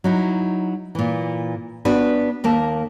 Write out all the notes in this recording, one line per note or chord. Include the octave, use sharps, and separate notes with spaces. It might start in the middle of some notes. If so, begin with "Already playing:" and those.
F#3 D#4 E4
A#2 E3
B3 D4 F#4 B4
D#2 A#3 A#4 A5